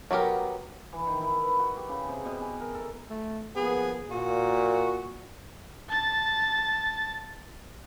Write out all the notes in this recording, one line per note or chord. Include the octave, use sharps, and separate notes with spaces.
F#3 B3 G4 A#4
E3
D#3
E4
B4
F#4
G4
C#3
C3
B2
G#5
A#4
A4
A3
F3 A#3 B3 G#4
A#2 F#4
A5 A6